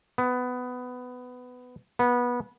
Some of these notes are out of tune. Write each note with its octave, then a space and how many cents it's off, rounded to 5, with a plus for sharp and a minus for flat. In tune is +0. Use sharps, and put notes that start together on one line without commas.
B3 +15
B3 -20